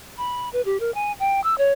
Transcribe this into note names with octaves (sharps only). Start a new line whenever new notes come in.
B5
B4
G4
A#4
G#5
G5
E6
C#5